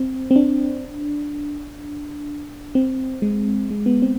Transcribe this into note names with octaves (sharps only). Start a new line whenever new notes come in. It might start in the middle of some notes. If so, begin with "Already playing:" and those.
Already playing: C4
C4
D4
C4
G#3
G#3
B3
C4